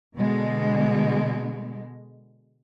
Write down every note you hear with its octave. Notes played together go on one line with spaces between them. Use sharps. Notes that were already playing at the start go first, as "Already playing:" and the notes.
B2 D3 G#3